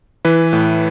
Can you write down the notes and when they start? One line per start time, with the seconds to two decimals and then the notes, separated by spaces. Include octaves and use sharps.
0.25 E3 B4
0.53 A2